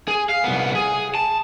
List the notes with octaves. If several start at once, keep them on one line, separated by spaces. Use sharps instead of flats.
G#4
F5
C2 B3
G#4
A5